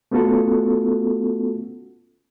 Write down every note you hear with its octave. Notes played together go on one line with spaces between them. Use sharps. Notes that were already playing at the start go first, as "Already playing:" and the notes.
A3 B3 C#4 F4 F#4 A4